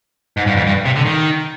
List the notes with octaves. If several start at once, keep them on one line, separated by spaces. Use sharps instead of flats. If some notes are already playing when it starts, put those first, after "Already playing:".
G#2
G2
F2
G2
C3
D3
D#3